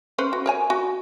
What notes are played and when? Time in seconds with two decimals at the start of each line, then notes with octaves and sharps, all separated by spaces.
0.18 C#4 B4 C5
0.33 F#4
0.46 A#4 C#5 G#5
0.70 F#4